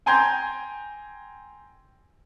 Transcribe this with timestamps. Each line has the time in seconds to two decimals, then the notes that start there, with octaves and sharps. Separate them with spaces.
0.06 G5 G#5 A#5 C6 G6 G#6